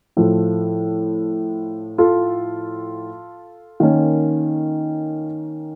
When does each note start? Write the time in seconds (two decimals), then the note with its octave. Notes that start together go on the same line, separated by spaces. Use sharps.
0.17 A2 F3 A3
1.98 F4 A4
3.80 D#3 A#3 C#4